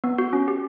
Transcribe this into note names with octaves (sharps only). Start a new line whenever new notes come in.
B3
F#4
C#4
G4